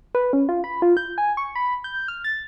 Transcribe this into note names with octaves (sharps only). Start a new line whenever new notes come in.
B4
C#4
F4
B5
F4
G6
G#5
C#6
B5
G6
F6
A6